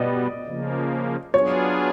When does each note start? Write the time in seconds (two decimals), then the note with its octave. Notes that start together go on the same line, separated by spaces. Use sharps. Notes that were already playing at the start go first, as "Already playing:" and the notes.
Already playing: B2 G3 B3 D5 D#5
0.45 C#3 F3 A#3
1.34 F#3 B3 D4 F4 G#4 C#5